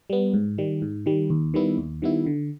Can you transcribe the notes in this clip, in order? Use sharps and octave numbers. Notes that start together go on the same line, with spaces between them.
G3 B3
G#2
D#3 G3
G#2
D#3 G3
D#2
D#3 G3 B3 E4
D#2
D#3 G3 B3 E4
D3